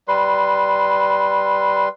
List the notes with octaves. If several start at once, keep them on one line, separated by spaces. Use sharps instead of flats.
G3 B4 C6